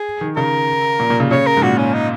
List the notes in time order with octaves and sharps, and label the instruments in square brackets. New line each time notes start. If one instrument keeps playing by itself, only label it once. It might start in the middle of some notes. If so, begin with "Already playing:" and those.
Already playing: [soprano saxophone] G#4
[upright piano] D#3
[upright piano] C#3 [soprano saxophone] A#4
[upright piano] A#2
A#2
C#3
[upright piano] C#3 [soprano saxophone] C#5
[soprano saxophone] A#4
[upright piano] G#2
[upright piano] A#2 [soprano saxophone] F#4
[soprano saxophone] C#4
D#4